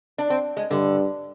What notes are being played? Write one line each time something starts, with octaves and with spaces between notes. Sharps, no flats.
D4
C4
G#3
G2 D3